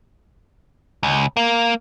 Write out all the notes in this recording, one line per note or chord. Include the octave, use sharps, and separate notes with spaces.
C#2
A#3